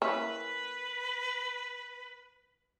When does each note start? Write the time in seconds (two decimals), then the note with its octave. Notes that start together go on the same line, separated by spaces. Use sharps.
0.02 A#3 C#4 E4 B4